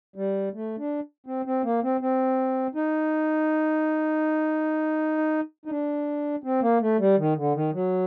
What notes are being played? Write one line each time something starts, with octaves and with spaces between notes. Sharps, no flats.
G3
A3
D4
C4
C4
A#3
C4
C4
D#4
D#4
D4
C4
A#3
A3
G3
D#3
D3
D#3
F#3